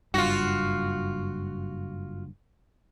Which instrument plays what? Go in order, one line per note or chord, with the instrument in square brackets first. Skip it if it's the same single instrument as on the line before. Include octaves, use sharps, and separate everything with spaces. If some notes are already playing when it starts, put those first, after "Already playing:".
[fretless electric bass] F#1 G2 [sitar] F4 F#4